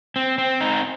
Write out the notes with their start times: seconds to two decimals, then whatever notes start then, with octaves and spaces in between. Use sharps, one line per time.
0.16 C4
0.38 C4
0.61 D#4